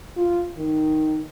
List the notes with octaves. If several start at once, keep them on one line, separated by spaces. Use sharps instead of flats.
F4
D#3